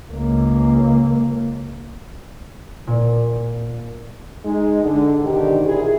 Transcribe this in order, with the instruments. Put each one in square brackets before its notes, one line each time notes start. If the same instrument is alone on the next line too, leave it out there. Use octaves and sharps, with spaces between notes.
[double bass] C#2 A#3
[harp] A#2
[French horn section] G#3 D#4
D3
G#2 B2 D3 D#3 D#4 G4
A#2 E4 G#4